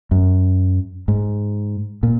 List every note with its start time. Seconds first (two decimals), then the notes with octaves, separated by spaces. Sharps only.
0.11 F#2
1.08 G#2
2.03 A#2